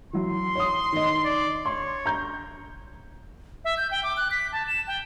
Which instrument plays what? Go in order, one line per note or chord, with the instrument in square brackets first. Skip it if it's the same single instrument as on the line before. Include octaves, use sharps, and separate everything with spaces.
[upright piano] E3 F#3 [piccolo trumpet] C6
[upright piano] C#5 D#6
D#3 D#5
[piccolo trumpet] D5
[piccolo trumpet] C#5 [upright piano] C6
[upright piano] A#5 G6
[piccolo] E5
G6
G5
D6
F#6
B6
A5
E7
G5